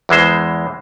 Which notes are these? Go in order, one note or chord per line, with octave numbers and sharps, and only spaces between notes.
E2 E3 G#3 C5